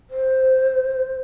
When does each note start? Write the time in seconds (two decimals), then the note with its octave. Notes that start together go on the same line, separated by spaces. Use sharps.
0.10 C5